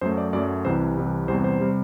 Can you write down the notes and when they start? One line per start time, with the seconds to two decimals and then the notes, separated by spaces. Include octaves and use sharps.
0.01 F#2 F#3 A3 C5
0.18 D5
0.33 F#2 F#3 A3 D5
0.65 C2 C3 E3 C5
0.97 C2 C3 E3
1.28 E2 C3 G3 C5
1.44 C5
1.61 C3 G3